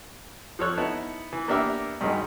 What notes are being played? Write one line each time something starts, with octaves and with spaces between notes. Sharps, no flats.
F3 A4 C#5 F#6
B3 D#4 E4 A5
E3
A#3 B3 D4 G4 A#4 E5
G2 D#3 F#3 G#3 D#4